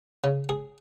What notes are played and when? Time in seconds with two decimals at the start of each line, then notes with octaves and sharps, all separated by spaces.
0.24 C#3
0.49 G#4